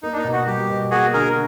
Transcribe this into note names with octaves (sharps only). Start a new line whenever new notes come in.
A#3 D#4
D4
D#4
B2
F#4
G3 G4
B2
A#3 F#4 G#4
D3 G#4 A#4